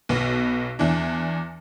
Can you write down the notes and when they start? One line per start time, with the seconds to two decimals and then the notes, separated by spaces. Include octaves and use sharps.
0.09 B1 B2 B3
0.79 E2 E3 D4